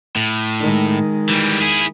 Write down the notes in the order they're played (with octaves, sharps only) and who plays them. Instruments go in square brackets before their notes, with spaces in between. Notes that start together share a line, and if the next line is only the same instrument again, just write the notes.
[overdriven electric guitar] A2
[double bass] D#3 G#3
[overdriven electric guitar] E3 G3
E4 G#4